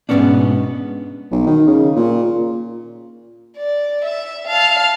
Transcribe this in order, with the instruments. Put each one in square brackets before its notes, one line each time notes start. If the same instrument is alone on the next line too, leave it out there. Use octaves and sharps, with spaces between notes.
[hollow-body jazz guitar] G#2 B2 G#3 B3 C#4 D4
[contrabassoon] B1
D#3
C#3
A#2
[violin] D5
E5
F5 A5